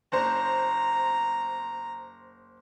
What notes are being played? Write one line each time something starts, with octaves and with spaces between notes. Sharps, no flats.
F#1 C5 A#5